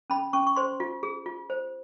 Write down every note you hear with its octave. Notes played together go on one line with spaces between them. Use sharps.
C#4 B5
C#4 C#6
C#6
C5 C6
F4
G#4
F4
C5